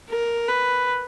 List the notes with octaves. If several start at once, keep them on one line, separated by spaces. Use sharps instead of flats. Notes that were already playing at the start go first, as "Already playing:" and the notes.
A#4
B4